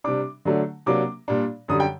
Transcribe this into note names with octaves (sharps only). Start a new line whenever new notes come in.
C3 G3 D4 D6
D3 F#3 A3 D4
C3 F#3 A#3 D4 D6
A#2 G3 D4
F#2 D3 G3 D#6
G5